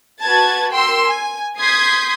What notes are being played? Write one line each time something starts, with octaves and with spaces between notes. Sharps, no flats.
F#4 B4 A5 G#6 A6
A#4 G5 C6 E6
G#5
C6 D#6 G6 G#6 B6 C7